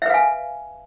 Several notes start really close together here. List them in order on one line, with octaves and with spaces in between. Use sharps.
E5 B4 F5 G#5